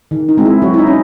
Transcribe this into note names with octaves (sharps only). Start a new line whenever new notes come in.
D#3
D#4
G#3 C4
E4
F#3 F#4
E4
D#4
C#4